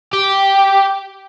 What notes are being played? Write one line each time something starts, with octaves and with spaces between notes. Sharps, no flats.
G4